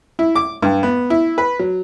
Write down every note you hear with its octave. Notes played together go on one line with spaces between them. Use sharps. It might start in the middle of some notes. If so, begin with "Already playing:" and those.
E4
D6
G2
B3
E4
B4
F#3